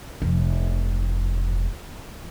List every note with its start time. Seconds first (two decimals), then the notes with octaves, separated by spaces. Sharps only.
0.22 F1 F3